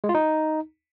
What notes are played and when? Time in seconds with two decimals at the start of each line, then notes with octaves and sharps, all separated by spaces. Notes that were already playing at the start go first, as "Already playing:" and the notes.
0.04 G#3
0.09 F4
0.15 D#4